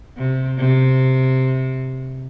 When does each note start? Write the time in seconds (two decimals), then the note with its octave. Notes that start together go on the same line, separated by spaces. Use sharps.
0.17 C3
0.58 C3